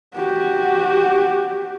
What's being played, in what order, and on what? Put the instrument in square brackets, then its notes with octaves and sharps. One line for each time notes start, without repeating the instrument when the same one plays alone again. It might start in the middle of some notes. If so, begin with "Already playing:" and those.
[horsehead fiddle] F#4 G4